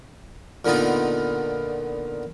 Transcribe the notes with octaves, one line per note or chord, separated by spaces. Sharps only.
A#2 D3 B3 D#4 F4